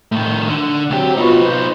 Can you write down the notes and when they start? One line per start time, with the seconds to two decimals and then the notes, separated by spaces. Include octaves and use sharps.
0.12 A2 D#3
0.48 D3
0.90 C#2 F#3 C4 G4
1.17 B3 D#4 F4 F#4 B4
1.43 C5